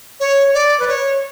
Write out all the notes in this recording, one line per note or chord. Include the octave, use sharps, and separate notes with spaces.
C#5
D5
B4
C#5